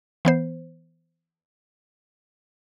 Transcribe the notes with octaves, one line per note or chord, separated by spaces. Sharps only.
E3 B3 C5